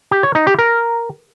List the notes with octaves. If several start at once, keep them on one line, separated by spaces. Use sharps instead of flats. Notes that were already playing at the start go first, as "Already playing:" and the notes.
G4
C#5
D#4
G4
A#4